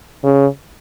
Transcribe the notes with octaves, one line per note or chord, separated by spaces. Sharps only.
C#3